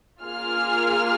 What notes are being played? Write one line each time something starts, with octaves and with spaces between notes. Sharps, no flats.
A#3 F4 G#4 F6